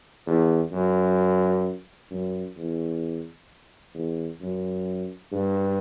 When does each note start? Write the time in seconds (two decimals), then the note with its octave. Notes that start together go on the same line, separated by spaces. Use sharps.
0.26 E2
0.72 F#2
2.11 F#2
2.57 E2
3.94 E2
4.41 F#2
5.32 G2